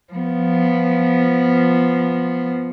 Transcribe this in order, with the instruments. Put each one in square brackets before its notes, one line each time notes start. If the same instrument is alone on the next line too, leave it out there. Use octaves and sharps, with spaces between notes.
[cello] F3 B3